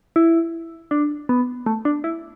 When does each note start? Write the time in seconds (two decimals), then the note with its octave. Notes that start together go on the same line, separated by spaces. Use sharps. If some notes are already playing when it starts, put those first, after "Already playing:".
0.16 E4
0.91 D4
1.29 B3
1.66 A3
1.85 D4
2.04 E4